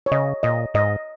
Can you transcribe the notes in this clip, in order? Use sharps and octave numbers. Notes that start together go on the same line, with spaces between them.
C#5
C#3 D#5
A#2 D#5
G#2 D#5